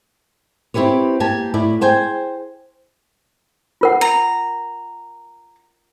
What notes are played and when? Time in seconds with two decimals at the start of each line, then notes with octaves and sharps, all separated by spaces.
0.74 C4 E4 G4 B4 C#5
1.20 A#3 G4 G#5 A5
1.54 A2 E4 D5
1.81 G#4 C5 G5 G#5
3.81 F4 A#4 F#5
4.01 A#5